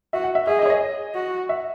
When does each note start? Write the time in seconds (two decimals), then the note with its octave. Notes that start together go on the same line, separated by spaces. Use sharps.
0.13 F#4 E5
0.24 F#5
0.35 E5
0.47 G#4 E5
0.59 D#5
0.66 C#5
0.70 D#5
1.15 F#4
1.49 E5